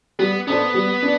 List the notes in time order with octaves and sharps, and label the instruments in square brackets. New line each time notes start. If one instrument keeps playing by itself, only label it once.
[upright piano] G3 [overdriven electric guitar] B3
[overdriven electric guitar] B3 [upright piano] D4 A4 C5
[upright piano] G3
D4